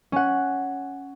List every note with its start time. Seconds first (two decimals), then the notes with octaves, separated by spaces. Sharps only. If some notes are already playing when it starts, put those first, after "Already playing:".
0.12 C#4 F#5